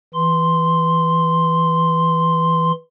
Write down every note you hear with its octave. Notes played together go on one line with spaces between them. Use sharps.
E3 C6